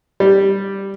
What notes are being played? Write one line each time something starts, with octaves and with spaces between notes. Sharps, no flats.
G3